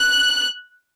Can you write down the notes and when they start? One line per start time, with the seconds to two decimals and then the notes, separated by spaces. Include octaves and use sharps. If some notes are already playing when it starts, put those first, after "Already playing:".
Already playing: F#6